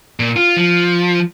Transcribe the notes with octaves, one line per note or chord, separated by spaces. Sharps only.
A#2
F4
F3